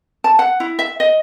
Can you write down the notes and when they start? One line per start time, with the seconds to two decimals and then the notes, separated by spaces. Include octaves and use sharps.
0.24 A5
0.39 F#5
0.60 E4
0.79 E5
1.00 D#5